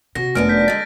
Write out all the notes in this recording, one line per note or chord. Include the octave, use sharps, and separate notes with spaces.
C3 F#4 A#6
F1 F#2 A3 B3 D4 F6 D7
G6 B6
D3 G#3 A6